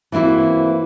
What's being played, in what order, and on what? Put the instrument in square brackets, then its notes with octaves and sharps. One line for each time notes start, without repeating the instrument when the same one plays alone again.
[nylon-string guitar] E3 A#3 C4 E4 F#4